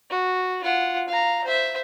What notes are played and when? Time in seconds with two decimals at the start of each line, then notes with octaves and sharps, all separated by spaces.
0.10 F#4
0.64 F4 F#5
1.08 F5 A#5
1.45 C5 E5